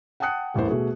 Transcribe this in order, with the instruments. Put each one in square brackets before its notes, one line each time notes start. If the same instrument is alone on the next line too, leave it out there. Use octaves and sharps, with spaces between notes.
[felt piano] F#5 G5 A5 D#6 F#6 C#7
D#1 A1 E3 A#4 C5
B2 A3 F#4 G#4